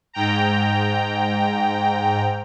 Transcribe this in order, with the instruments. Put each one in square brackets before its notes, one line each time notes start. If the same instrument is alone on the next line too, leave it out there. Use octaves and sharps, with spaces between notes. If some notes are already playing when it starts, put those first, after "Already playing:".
[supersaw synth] G#2 G5 A#5